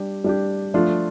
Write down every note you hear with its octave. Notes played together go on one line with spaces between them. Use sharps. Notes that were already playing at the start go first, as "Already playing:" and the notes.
Already playing: G3 D4 G4
G3 D4 G4
F3 A3 D4 F4